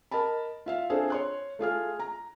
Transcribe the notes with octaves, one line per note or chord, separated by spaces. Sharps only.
A#4 D#5 A5 B5
F4 E5 F5
C4 D4 F4 G#4 A4 C5
C#5 C6 F#6
A3 F4 G#4 F6
A#5